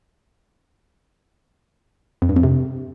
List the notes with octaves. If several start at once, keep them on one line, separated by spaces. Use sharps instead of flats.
F2
G2
F2
C3